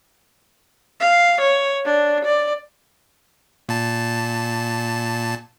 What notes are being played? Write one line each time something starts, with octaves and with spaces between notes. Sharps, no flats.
F5
C#5
D4
D5
A#2 A5